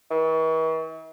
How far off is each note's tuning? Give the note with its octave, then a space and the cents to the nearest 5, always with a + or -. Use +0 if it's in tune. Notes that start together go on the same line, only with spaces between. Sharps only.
E3 -45